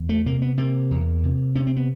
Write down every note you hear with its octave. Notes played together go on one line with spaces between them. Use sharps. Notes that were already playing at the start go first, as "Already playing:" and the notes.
Already playing: E2
A3
C3 A#3
B3
C3 A#3
E2
C3
C3 C#4
C4
B3